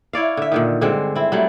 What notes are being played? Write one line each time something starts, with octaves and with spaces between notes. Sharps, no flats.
E4 C#5 D5 F5
D3 E5
A#2 D3 D#3
G2 D3 G#3 C4
C4 E4
F#3 G3 A3